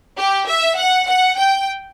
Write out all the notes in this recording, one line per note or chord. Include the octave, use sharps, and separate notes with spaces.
G4
E5
F#5
F#5
G5